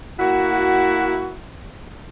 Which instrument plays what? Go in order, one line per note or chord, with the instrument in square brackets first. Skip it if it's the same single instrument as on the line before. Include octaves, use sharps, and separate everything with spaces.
[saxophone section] A#3 E4 F#4